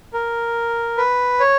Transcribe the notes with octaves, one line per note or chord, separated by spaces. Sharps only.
A#4
B4
C#5